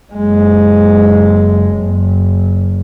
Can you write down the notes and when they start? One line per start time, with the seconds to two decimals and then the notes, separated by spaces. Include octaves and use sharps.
0.13 F#1 G#3
1.70 F#1